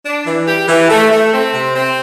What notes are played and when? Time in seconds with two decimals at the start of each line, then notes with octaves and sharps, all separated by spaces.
0.06 D4
0.26 E3
0.47 G4
0.69 E3
0.90 A3
1.12 A3
1.33 C4
1.54 C3
1.74 C4